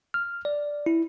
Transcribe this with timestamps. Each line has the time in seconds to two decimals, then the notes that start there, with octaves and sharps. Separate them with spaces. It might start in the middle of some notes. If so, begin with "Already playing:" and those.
0.14 F6
0.45 D5
0.86 E4